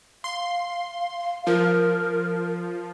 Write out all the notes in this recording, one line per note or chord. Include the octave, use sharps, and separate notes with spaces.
F5 C6
F3 F4 A#4